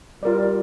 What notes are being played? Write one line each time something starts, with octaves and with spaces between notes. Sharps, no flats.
G3 F4 A#4 D5